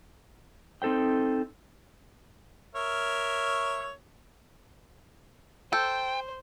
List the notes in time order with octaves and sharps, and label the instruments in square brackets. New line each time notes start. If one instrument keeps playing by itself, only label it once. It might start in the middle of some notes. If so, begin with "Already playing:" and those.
[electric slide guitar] C4 D#4 A4 C5 G5
[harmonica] A#4 C#5 E5
[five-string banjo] A4 [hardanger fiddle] C5 [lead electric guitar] G5 [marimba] G6